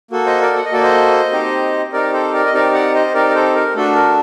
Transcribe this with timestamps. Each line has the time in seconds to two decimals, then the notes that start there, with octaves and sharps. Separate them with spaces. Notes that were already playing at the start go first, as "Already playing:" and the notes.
0.11 A#3 F#4 A4
0.26 C5 D#5
0.41 A#4 D5
0.56 F#5
0.65 D#5
0.71 A#3 F#4 A4 D5
0.82 C5 D#5
1.32 C4 D#4 G4
1.93 C4 D#4 G4 A#4 D5
2.13 A4 C5
2.34 A#4 D5
2.46 D#5
2.54 C4 D#4 G4 A#4 D5
2.74 D5 F#5
2.94 C5 D#5
3.14 C4 D#4 G4 A#4 D5
3.29 A#4
3.35 A4 C5
3.55 A#4
3.75 A3 D4 F#4 A4
3.95 A#4